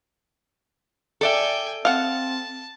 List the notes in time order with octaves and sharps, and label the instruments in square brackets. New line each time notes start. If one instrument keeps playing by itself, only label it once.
[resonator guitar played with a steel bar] A4 D5 E5 [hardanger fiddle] G5 G#5
[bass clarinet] C4 [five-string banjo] F5 F#5 [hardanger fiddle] A5